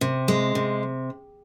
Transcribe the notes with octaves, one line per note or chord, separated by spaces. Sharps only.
C3
G#3
C3